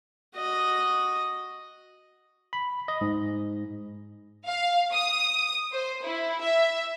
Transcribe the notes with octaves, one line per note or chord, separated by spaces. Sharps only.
F#4 D#5
B5
D#5
G#2
F5
D#6
C5
E4
E5